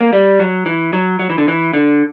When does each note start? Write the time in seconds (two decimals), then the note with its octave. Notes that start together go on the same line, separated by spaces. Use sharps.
0.01 A#3
0.13 G3
0.40 F#3
0.66 E3
0.93 F#3
1.19 F#3
1.30 E3
1.38 D3
1.48 E3
1.73 D3